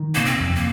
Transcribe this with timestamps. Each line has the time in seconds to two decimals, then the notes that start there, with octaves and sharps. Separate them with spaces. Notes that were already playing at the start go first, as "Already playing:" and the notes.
Already playing: D#3
0.15 C3 A#3
0.25 C4
0.40 F2
0.55 A#3